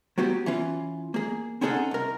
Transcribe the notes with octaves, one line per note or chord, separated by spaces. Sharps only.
F#3 B3 F#4 G4
E3 C#4 F4
A#3 G#4
C4 C#4 D#4 G#4 A4 F#5
C2 A#4